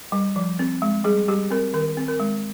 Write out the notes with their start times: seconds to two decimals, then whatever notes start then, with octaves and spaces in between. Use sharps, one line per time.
0.12 G3
0.36 F3
0.59 C4
0.82 G#3
1.04 G3 G#4
1.28 G3 G4
1.51 C4 A#4
1.74 D#3 A#4
1.97 C4
2.08 A#4
2.20 G#3